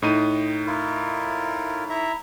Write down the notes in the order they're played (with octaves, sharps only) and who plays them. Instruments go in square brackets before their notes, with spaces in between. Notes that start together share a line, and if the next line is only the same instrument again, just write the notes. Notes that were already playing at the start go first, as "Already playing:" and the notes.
[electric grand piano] A2 D#4 D#7
[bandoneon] E4 F4 A#4
E4 E5 A#5